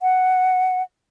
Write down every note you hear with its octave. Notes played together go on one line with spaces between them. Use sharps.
F#5